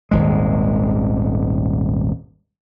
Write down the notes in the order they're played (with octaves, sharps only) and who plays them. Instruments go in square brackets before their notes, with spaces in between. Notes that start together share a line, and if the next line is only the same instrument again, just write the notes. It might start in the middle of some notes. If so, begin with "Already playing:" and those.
[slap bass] D#1 G#1 G#3